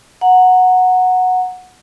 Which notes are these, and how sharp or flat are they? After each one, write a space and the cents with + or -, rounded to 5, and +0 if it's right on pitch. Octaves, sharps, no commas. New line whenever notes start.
F#5 -10 A#5 -10